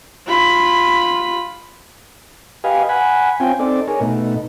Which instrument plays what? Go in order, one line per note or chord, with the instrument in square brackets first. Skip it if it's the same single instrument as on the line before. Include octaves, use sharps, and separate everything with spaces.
[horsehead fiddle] F4 B5
[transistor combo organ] G4 B4 D#5 F5 G#5
F#5 G#5 B5
C4 C#4 F4 G5 G#5
C4 D#4 A4 D5
G#4 A#4 C#5
B2 A3 D#4